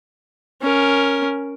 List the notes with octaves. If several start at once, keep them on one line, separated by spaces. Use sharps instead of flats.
C#4 A#4